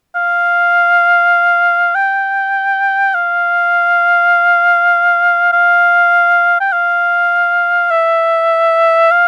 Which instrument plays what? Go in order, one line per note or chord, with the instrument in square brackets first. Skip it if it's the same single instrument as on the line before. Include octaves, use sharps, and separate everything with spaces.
[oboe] F5
G5
F5
F5
G5
F5
E5
F5